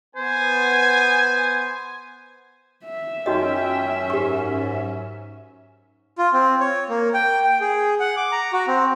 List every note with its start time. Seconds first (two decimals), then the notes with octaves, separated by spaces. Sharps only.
0.16 B3 C5 G#5
2.85 E5
3.26 F#2 C#4 D#4 F4 F#4 C#5 D#5 G5
4.10 G#2 G4 C#6
6.17 F4
6.33 C4
6.60 C#5
6.89 A#3
7.14 G5
7.45 G5
7.60 G#4
8.00 F#5
8.17 D6
8.32 A#5
8.53 F#4
8.67 C4